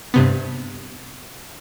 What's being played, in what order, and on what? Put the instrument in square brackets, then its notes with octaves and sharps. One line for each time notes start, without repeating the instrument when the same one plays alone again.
[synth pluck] G2 C3 B3